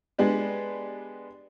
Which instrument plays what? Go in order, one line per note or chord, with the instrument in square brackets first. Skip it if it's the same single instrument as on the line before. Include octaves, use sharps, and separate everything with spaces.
[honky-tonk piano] G#3 B3 D4 G4